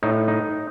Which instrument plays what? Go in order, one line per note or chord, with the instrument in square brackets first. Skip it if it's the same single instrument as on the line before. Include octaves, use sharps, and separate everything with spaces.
[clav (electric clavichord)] A2 D#4
D#4